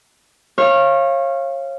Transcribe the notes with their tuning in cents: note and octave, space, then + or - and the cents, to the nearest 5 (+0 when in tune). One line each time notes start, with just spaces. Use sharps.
C#5 -30 F5 -15